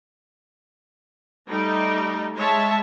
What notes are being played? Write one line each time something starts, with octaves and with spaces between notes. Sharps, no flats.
G3 A3 D#4
G#3 C#5 E5 A5